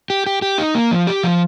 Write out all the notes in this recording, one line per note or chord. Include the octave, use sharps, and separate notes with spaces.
G4
G4
G4
D#4
A#3
F3
G4
F3